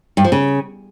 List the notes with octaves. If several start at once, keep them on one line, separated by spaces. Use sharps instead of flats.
G2
F3
C#3